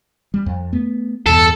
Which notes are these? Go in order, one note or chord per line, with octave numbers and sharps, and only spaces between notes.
G3
F2
A3 B3
E2 G2 B2 A4